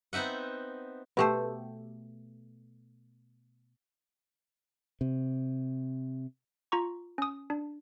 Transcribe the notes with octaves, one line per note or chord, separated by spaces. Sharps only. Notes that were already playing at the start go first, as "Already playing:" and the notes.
B3 C4 D#4 E5 F#5
B2 A3 B3 G4 A4 C5
C3
F4 A#5 C#6
C#4 D#6
D4